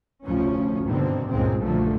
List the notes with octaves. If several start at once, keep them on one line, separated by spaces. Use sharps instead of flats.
F1 D2 F3 C#4
G#1 G2 B2 D3 D#3 C4
C#2 G2 A#2 D#3 G#3 C4
B1 G2 A#2 D3 F3 A3